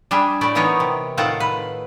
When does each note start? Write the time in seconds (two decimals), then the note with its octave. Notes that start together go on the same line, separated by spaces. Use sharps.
0.11 G3 D4 G#4 E5
0.41 A2 A3 E4 D5
0.55 E3 F#3 B3 D#4 A#4 C#5
0.80 C3
1.17 A2 D#3 C4 F4 F#5 A5
1.40 B4